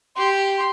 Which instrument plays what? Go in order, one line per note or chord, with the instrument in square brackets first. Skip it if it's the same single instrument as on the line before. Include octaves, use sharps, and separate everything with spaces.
[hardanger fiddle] G4 [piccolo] C6
[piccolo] C6